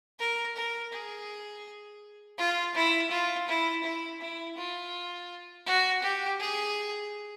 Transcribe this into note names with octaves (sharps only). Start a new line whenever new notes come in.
A#4
A#4
G#4
F4
E4
F4
E4
E4
E4
F4
F#4
G4
G#4